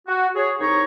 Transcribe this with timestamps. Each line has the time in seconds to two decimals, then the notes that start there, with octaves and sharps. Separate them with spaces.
0.08 F#4
0.35 G#4 C#5
0.60 C2 D#4 C#5 A#5 C#6